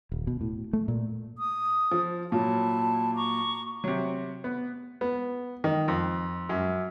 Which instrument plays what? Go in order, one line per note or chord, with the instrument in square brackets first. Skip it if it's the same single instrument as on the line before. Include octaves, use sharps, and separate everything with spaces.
[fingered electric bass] D#1
B2
A2
A3
A#2
[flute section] D#6
[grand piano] F3
[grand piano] A#2 F#3 [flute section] E4 A5
[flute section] A#5 C#6 D6
[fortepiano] C3 F#3
B3
B3
D#3
F2
F#2